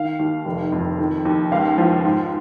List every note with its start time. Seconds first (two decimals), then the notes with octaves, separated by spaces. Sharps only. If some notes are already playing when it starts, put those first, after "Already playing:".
Already playing: D#3 F5
0.19 D#2
0.45 F1
0.72 F2
0.99 D#3
1.25 D#2
1.52 C#2 F5
1.78 F3
2.05 G#2